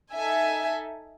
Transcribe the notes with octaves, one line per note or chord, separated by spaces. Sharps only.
D#4 A4 E5 G#5